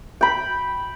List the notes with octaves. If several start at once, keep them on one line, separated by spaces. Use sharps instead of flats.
G5 B5